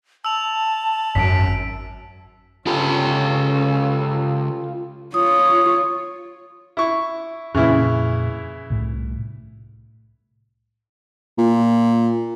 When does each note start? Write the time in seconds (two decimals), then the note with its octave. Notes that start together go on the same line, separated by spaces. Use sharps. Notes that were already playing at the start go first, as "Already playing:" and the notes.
0.25 A5 E6 F7
1.15 G#1 F#2 B6 D7
2.67 C#2 C#3 C#4 F4 G4 A4
5.14 F4 C#5 D#6
6.77 E4 C#6
7.54 F2 A#2 C#3 E3 A#3 E4
8.70 C2 A2
11.38 A#2